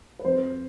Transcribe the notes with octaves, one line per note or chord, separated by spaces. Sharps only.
B4
F2 C5